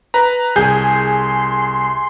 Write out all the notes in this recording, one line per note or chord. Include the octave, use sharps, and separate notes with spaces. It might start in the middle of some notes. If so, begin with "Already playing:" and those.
B4 A#5
C2 G#4 C6 G6